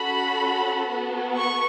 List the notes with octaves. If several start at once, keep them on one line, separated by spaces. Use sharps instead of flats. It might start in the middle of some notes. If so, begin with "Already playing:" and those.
Already playing: C#4 F#4 A4 B5
B3 F#4 A4
C#6